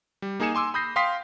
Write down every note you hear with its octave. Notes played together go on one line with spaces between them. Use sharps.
G3
A#3 D#4 G#4 G#5 C#7 E7
G#5 C6 D6 E6
B5 D#6 G6 A#6 C7
F5 G5 C6 D#6 B6 C7